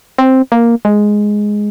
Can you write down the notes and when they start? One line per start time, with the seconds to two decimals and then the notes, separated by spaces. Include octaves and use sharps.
0.18 C4
0.52 A#3
0.85 G#3